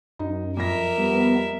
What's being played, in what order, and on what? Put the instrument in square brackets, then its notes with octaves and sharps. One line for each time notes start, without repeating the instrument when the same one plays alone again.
[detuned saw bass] F#2 [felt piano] D#4
[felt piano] F2 A#6 [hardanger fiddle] A#4 E5
[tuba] G3 [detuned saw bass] B3